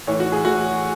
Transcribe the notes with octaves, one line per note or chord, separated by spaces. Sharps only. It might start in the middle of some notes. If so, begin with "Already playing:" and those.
A2 E3 C#5
F#4
G#4
A2 E3 F#4